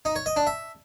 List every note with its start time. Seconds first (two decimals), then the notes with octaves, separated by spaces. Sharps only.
0.05 D#4
0.16 C#5
0.26 D#5
0.36 D4
0.47 E5